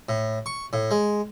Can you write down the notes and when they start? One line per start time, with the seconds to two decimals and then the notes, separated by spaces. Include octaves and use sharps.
0.09 A2
0.46 C#6
0.73 A2
0.91 G#3